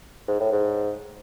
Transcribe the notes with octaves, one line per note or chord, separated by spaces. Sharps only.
G#2
A2
G#2